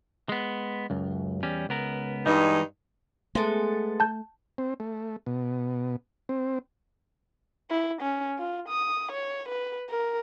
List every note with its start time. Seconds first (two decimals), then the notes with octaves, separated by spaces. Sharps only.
0.29 G#3 B3
0.90 C#2 F#2
1.43 E2 G3 C#4
1.69 C#2 B3 A#4
2.26 G2 E3 G#3 D#4
3.35 G#3 A3 B3 A4
4.00 A5 G6
4.58 C4
4.80 A3
5.26 B2
6.29 C4
7.70 E4
8.01 C#4
8.38 F4
8.68 D#6
9.12 C#5
9.48 B4
9.89 A#4